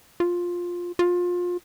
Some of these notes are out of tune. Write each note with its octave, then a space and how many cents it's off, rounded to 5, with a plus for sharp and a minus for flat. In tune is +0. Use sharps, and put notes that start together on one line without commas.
F4 +10
F4 +25